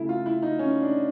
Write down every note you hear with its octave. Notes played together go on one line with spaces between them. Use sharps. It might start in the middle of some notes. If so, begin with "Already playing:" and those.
Already playing: C#3 A3 E4
F4
E4
D#4
C#4
D4